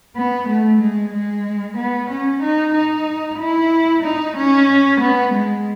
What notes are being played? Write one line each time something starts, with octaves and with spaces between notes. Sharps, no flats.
B3
A3
G#3
G#3
B3
C#4
D#4
D#4
E4
D#4
C#4
B3
G#3